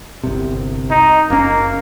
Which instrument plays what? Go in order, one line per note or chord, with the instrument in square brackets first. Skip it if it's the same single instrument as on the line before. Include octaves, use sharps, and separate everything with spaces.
[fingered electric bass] G1 C2 C3
[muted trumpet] D#4
[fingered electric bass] F#1 C#4 [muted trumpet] A#3